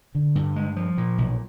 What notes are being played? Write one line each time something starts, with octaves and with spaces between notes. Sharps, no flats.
D3
G2
G#3
F3
A#2
B1